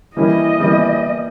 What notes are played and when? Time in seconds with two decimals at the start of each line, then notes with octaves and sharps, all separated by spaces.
0.17 E3 G3 A#3 C#4 E4 D#5
0.59 E3 G3 A#3 C#4 E4